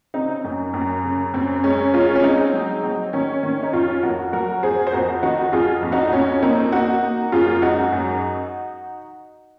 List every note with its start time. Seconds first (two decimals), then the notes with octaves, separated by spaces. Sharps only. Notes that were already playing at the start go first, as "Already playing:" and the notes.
0.14 C#3 C4 D#4
0.44 F#2
0.73 F#2
1.04 C#3
1.34 F#2 C4
1.64 G#3 C#4
1.94 G#3 C#4 F4
2.15 C#4
2.23 G#3 C4 D#4
2.53 F#3
2.83 F#3
3.13 D#3 C#4
3.43 D#3 C#4
3.63 D#4
3.73 F2 C#4 F4
4.03 F2 F#4 A#4
4.33 F#3 F#4 A#4
4.63 F2 G#4 C5
4.87 C5
4.92 F2 F#4 A#4
5.23 D#3 D#4 F#4
5.52 F2 F4 G#4
5.82 F2
5.92 D#4 F#4
6.12 F2 C#4
6.42 A#3 C4 D#4
6.72 A#3 D#4 F#4
7.02 A#3
7.32 F#2 F4 G#4
7.62 G#3 D#4 F#4
7.92 F#2